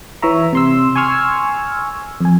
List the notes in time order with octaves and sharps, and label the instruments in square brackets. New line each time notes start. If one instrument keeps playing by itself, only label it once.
[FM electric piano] E3 C#5 E5 A#5
C3 C6 E6
G#5 C6 C#6 E6 F6 G#6
F2 G#5